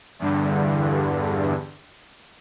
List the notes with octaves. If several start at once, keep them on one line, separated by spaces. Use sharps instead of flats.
E2 G2 D3